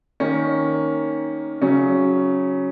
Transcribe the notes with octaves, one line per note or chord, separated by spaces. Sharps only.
D#3 A#3 C#4
C#3 F#3 C#4